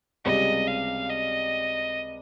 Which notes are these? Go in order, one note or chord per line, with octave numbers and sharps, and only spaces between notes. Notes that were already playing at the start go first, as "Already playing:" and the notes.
C#2 C3 G3 D#5
F5
D#5